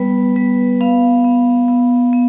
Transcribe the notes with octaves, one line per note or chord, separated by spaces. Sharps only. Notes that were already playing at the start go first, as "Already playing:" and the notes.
Already playing: G3 B3 B4
B3 B4
B3 F5
B3
B3
B3